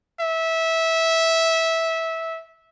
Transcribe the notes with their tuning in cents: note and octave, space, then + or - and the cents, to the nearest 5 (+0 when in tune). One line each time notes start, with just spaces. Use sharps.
E5 -15